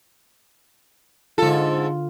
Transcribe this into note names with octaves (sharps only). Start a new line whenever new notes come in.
G#2 D3 F4 A4